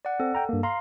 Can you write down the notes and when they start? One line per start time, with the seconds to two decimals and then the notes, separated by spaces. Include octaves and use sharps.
0.05 D5 F#5
0.20 C4 A4
0.35 G5 A#5
0.49 G2 A#3
0.63 F5 A#5 C6